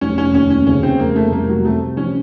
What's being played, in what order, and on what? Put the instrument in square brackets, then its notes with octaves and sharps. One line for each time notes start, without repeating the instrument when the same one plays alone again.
[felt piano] F1 [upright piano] C#4
[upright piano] C#4
[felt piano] D#2 [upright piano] C#4
[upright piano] C#4
[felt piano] C#3 [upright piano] C#4
[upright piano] C4
[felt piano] F1 [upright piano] A#3
[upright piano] A3
[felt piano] C2 [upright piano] A#3
[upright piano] F#3
[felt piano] C3 [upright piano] A3
[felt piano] F3 [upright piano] C#4